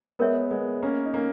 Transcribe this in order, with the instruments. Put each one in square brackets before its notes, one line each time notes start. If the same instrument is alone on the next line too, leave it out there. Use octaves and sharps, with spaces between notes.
[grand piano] G#3 B3 [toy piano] A#4 C#5 E5
[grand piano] G#3 B3
A#3 C#4
D#4
A#3 C#4